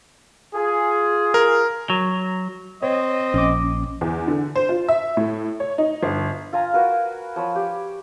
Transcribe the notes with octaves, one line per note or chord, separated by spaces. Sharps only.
F4 G#4
A#4
F#3
C4 C#5 D#5
A#1 C#4 D6
E2
D3
C5
F4
E5
A2
C#5
D#4
G1
F4 F5 G#5 A#5
F#4 A#4 B4 F5
F3 C#5 B5
G4